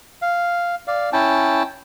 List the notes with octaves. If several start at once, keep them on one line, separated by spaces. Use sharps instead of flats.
F5
D5 F5
C#4 E4 G5 A5